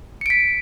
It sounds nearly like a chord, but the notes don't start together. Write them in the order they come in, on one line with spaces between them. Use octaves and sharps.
C#7 D7 B6